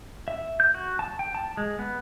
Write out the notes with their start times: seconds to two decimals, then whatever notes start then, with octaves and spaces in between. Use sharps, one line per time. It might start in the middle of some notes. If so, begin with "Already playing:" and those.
0.28 E5
0.60 G6
0.75 F#4
0.99 A5
1.19 G5
1.35 A5
1.57 G#3
1.79 B3